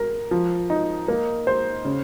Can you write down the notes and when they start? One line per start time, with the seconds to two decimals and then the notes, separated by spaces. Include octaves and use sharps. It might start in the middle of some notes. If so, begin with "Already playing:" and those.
Already playing: A#4
0.31 F3
0.70 D#4
1.08 A#3
1.47 C5
1.85 C#3